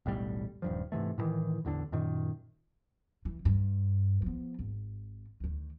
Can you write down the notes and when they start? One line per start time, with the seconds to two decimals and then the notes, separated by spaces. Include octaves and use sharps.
0.06 E1 B1 A2 G3
0.62 D#1 G2 F3
0.92 G#2 C3 E3 A3
1.18 A2 C3 D#3 E3
1.65 A1 E2 D3 D4
1.92 F#2 A#2 D#3
3.25 E3
3.45 G2
4.22 F3 B3
4.59 G#1
5.40 D2 D#3